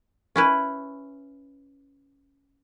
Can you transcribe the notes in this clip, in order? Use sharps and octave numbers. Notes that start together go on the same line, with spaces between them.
C#4 E4 B4